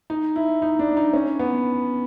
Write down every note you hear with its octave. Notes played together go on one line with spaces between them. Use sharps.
D#4
E4
D#4
D4
D#4
C#4
B3